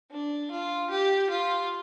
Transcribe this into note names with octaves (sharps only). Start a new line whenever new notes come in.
D4
F4
G4
F4